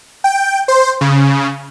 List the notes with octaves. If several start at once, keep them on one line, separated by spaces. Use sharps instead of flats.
G5
C5
C#3